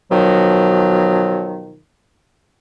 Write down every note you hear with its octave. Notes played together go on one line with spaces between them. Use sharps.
B2 D#3 F3 F#3